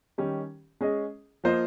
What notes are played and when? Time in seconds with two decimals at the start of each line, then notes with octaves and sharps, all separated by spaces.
0.18 D#3 G3 C#4 G4
0.81 G#3 C#4 G#4 D#5
1.44 F3 A#3 F4 C5 D#5